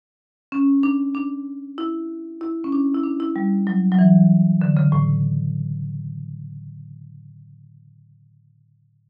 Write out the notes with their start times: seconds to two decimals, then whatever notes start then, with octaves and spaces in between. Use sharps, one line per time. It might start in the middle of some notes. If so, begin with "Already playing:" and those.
0.52 C#4
0.83 D4
1.15 D4
1.78 E4
2.41 E4
2.64 C#4
2.72 D4
2.94 E4
3.03 D4
3.20 E4
3.36 G3
3.67 F#3
3.92 F#3
3.99 E3
4.62 D3
4.77 C#3
4.92 A2